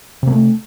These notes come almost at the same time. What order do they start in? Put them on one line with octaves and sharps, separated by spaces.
C3 A#3 A3